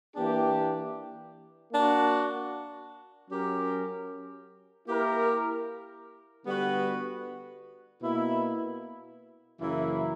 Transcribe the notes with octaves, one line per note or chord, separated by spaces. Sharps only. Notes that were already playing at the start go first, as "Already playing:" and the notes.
E3 A#3 D4 G4
A#3 D4 F#4
F#3 C#4 G4 A#4
A#3 E4 G4 A#4
D3 G3 B3 F#4 B4
B2 A#3 E4
F#2 C#3 E3 A#3 E4